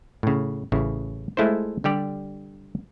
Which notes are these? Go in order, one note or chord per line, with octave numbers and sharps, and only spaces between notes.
A2 C#3
A1 C#3 E4
G#3 A3 E4 F4 C5
D3 G3 G4 D5